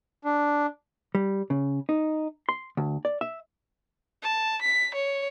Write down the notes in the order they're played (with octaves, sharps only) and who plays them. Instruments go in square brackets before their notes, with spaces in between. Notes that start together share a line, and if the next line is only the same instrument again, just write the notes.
[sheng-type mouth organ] D4
[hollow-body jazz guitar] G3
C#3
D#4
C6
D2
D5
E5
[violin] A5
B6
C#5